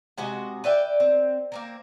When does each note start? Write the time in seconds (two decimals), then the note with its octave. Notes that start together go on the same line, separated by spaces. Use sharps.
0.18 C3 G#3 F#4 D#5
0.64 B4 D5 E5 G5
1.00 C4
1.52 A#3 C4 A#4